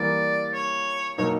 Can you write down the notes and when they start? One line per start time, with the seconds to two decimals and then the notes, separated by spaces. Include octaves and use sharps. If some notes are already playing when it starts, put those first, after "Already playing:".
Already playing: E3 G3 A#3 D5
0.54 C#5
1.17 B2 F#3 A#3 D#4 C#5